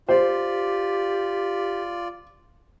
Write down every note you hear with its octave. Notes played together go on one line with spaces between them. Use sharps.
F4 G4 C5 D5